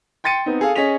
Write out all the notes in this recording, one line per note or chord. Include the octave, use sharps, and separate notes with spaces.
G5 C6 A6 C#7 D#7
B3 C4 D#4
G#4 A4 F5
C#4 G#4 D#5 B6 F7